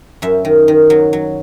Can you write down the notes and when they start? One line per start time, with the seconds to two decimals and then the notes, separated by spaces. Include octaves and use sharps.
0.22 F#2 E5
0.45 D#3
0.68 D#3
0.90 F#3
1.13 F#3